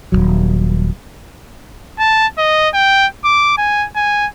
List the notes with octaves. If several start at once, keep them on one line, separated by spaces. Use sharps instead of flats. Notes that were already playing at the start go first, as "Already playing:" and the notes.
D#1 A#1 F#3
A5
D#5
G5
D6
G#5
G#5